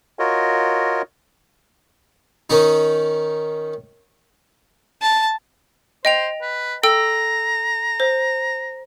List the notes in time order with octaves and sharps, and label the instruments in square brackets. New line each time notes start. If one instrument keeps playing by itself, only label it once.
[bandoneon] F4 F#4 A#4 C#5 D#5
[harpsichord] D#3 C#4 D#4
[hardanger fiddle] A5
[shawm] C5 [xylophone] D#5 G5 F7
[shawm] B4
[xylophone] A4 G5 E6 [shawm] A#5
[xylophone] C5